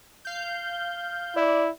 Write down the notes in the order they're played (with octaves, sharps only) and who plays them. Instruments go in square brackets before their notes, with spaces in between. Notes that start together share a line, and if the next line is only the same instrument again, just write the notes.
[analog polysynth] F5 G6
[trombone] E4 [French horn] D5